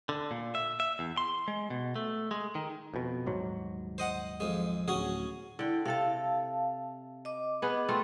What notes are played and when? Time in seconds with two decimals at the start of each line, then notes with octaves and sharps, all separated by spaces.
0.09 D3
0.31 A#2
0.55 E5
0.80 E5
0.99 E2
1.17 C6
1.48 G#3
1.70 B2
1.96 A3
2.31 G#3
2.55 D#3
2.94 F2 B2
3.26 D#1 G#2 F#3
3.98 C5 D#5 F#5
4.40 F2 G#3
4.88 D1 C#4 F#4 G#4
5.59 D3 E4 G5
5.85 C3 A4 F5 A5
7.25 D#5 D6
7.62 B3 G#4 B4
7.88 A3 C4 F4